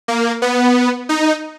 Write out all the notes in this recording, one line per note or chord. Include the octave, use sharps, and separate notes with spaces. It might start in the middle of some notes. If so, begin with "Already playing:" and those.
A#3
B3
D#4